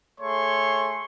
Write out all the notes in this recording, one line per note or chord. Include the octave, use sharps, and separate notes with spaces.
A3 G#4 C#5 C6 C#6